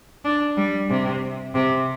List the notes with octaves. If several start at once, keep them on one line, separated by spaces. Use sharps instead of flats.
D4
G3
C3
C3